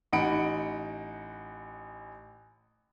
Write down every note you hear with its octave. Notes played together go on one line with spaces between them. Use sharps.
A1 D#4 F#5 B5 C#7 D7